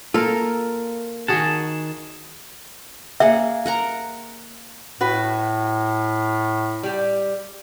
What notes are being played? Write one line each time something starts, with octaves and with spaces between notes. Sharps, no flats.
A#3 F4 A4 A#4
D#3 F#4 G#4 F#5 A5
A#3 G#4 E5 F#5
A#4 F#5 A#5
A2 F#4 B4
G3 G4